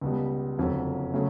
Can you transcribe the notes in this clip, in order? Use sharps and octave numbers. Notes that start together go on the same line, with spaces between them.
C#2 B2 G3
F#1 F2 D3 F#3
C#3 F#3 A3 C#4